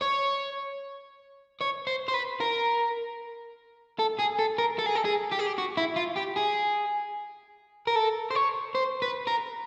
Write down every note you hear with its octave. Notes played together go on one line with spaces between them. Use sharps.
C#5
C#5
C5
C5
B4
A#4
A4
G#4
A4
A#4
A4
G#4
A4
G#4
G4
G#4
G4
F#4
E4
F4
G4
G#4
A#4
A4
C5
C#5
C5
B4
A#4